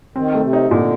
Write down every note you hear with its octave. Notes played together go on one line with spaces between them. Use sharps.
D#3 C4
A3
C3
D#4
D3
A#2